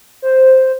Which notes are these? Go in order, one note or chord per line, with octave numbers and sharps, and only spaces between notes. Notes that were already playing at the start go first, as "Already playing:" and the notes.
C5